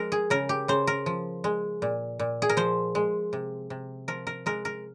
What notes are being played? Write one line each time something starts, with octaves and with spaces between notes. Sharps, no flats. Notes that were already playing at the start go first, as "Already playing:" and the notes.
Already playing: F3 G#3 A#4
G#4
C#3 A#4
G4
C#3 C5
A#4
F3
G#3
A#2
A#2
G#4
A#4
F3 C5
G#3
C3
C3
F3 A#4
A#4
G#3 A#4
A#4